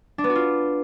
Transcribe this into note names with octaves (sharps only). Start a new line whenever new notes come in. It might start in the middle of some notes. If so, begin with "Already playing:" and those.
D4
B3
F#4
F4